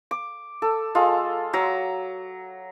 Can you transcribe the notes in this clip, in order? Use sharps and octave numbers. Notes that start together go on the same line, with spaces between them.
D6
A4
G#3 F4 A4
F#3 A#5